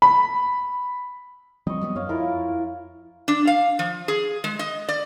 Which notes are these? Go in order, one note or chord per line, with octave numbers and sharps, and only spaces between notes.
B5
F3 G3 C4 D#5 C#6
F#3 G3 B3
F#2 C#5 F5
F2 E4 F4 A#4
D4
F5
F3
G#4
G#3
D#5
D5